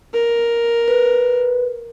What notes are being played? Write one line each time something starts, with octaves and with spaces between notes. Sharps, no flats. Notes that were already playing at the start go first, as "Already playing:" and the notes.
A#4
B4